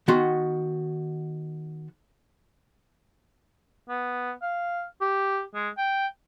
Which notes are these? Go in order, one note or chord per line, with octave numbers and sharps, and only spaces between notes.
D#3 B3 F#4 C6
B3
F5
G4
G#3
G5